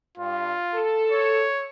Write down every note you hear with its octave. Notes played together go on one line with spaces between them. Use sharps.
G2 F4
A4
C#5